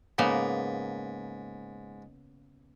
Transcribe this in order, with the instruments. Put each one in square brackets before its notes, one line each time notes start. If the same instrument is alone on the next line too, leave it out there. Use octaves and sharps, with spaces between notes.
[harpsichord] G#2 [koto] C#3 A#3 B3